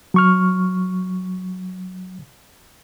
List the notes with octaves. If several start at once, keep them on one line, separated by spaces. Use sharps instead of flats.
F#3 C#6 F6